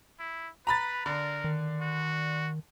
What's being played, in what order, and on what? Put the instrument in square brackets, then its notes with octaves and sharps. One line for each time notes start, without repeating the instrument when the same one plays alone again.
[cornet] E4
[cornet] B4 [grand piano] A#5 B5 A6
[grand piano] D3 [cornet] A#4
[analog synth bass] D#3
[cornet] F#4